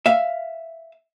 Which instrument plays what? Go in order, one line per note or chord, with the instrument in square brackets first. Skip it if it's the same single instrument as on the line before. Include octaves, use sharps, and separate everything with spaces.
[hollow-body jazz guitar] E5 F5